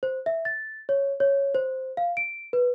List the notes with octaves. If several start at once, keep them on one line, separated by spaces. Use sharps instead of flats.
C5
E5
A6
C#5
C#5
C5
F5
D7
B4